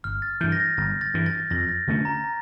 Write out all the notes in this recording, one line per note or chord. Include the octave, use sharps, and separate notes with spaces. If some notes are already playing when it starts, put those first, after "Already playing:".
G1 F6
A6
G2 E3 G6
A#6
A6
G1 A6
A6
G2 E3
A6
F2 A#6
A6
D3 A3 C#4
A#5
A#5